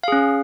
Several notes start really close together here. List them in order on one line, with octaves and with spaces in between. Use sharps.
F5 G#4 C#4